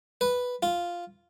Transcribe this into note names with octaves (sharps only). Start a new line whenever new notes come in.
B4
F4